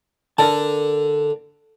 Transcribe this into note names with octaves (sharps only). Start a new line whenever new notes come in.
D3 A#4 D5 A5